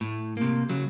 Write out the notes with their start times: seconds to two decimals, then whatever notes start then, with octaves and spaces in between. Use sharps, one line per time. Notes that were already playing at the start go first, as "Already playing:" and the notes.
0.01 A2
0.37 C3 A#3
0.69 C#3 F#3